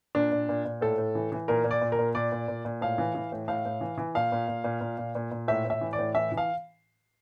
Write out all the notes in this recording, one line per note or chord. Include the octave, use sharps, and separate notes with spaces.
A#2 D4
A#2
A#2
A#2
A2 A4
A2
E3
E3
A#2 A#4
A#2
D5
A#2
A#4
A#2
A#2 D5
A#2
A#2
A#2
A2 F5
E3
E3
A2
A2 F5
A2
E3
E3
A#2 F5
A#2
A#2
A#2
A#2
A#2
A#2
A#2
A2 E5
A2
E5
E3
D5
A2
E3 E5
E3
F5